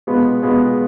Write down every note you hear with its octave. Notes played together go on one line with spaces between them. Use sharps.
B2 G#3 B3 F4
B2 G#3 B3 F4